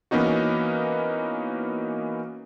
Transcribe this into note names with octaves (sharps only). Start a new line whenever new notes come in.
E3 A#3 B3 C#4 D#4 F#4